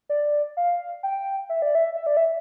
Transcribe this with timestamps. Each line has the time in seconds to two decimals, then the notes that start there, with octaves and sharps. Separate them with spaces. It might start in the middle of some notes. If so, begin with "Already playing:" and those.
0.09 D5
0.57 F5
1.03 G5
1.49 E5
1.62 D5
1.75 E5
1.96 E5
2.07 D5
2.17 E5